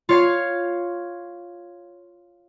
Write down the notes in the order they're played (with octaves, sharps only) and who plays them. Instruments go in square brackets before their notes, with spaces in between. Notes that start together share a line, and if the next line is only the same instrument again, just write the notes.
[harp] F4 C#5 F5